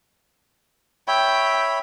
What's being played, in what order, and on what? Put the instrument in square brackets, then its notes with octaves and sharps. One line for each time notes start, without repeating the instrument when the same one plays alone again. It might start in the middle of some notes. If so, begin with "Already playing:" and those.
[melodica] C#5 E5 B5 [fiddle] G5